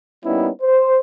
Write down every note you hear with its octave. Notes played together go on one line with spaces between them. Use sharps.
G3 A#3 B3 C#4 D#4 E4
C5